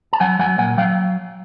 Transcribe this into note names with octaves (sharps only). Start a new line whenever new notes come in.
A5
F#3 F#5 G#5
F#3 F#5 G#5
A#2 F#5 G#5
F#3 F5 G5